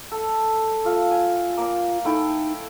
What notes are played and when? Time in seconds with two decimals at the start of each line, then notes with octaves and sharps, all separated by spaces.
0.12 A4
0.85 A3 F4 F5
1.11 G#5
1.57 A#3 D5
2.05 A3 D#4 E4 G5